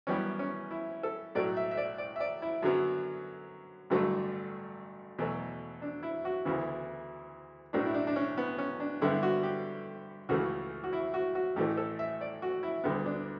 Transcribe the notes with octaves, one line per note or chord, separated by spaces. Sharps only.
F#2 E3 G3 B3 C#4
C#4
E4
A4
B1 A2 F#3 A3 D5
E5
E5
D5
D5
E5
D5
E4
F#2 D3 F#3 B3
A1 G2 D3 F#3 A3
E2 B2 F#3 A3
D4
E4
F#4
D2 C#3 E3 B3 E4
B1 A2 F#3 A3 D4
E4
D4
D4
C#4
B3
C#4
D4
G2 D3 G3 B3 E4
F#4
G4
C#2 C#3 E3 A3 F#4
F#4
E4
F#4
F#4
A1 A2 E3 A3 G4
A4
E5
D5
F#4
E4
D2 D3 G3 B3
D4